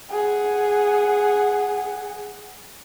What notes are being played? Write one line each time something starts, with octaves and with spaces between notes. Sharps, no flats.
G#4 F#5